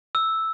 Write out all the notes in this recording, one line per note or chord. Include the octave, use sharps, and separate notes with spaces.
E6